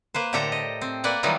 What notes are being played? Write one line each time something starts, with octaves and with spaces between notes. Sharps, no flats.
A#3 B4 C5
A2 D3 G4 A4 G5 A#5
D#5
C4
A#3 B4 D5 F#5
D#3 E3 F#3 G3 D#4 F4